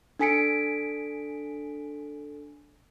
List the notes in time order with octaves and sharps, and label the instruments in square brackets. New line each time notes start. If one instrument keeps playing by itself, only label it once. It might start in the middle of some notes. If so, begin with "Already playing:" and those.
[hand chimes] D4 A4 G#5 B6 C#7 D7